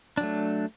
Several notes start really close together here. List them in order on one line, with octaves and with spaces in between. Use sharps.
D4 F#3 A3